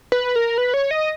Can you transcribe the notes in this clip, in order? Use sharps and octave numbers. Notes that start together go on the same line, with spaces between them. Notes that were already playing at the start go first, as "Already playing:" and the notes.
B4
A#4
B4
C#5
D#5